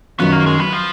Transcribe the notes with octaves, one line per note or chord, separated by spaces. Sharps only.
F#2 D#3 F#3 B3 C#4 F4
A#3
G#3
B3
F3